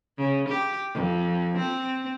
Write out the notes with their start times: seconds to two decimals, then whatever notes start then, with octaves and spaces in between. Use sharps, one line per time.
0.18 C#3
0.49 G4
0.94 F2
1.58 C4